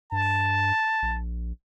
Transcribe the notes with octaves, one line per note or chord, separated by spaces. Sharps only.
G2 A5
A#1